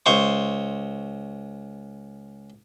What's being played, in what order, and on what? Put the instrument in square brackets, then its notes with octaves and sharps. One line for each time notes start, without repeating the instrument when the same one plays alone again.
[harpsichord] C#2 C5 C#6